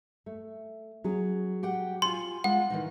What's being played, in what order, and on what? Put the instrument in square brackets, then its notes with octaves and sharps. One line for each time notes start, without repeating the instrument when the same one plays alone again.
[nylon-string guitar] A3
F#3 C#4 G#4
[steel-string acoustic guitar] G4 F#5 G5
[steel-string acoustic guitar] F4 G#5 [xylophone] C6
[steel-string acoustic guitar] G#3 F4 [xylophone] F#5
[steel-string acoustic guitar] D#3 E3 D#4